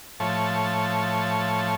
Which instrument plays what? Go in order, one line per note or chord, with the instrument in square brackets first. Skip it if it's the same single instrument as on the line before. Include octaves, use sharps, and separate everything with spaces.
[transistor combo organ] A2 F3 C#5 A5